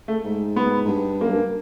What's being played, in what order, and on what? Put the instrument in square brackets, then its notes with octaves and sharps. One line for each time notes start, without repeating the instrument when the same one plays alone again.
[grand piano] A3
[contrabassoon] G#2
[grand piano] B3
[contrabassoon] G#2
G2
[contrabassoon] F#2 [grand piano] A#3
[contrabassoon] G2